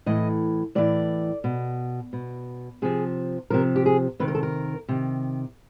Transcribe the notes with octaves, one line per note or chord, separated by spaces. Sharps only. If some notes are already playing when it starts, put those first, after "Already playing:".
A2 E3 D#5
A2 E3 D5
B2
B2
C3 F3 G#4
C3 F3 A#4
G4
G#4
C3 D#3 B4
A#4
A4
A#4
C3 D#3